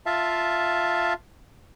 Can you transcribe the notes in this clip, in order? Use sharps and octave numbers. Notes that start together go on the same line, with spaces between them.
F4 E5 F5 A5